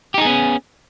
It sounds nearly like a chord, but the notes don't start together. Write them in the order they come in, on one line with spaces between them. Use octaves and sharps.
G4 D#4 G#4 B3 C#4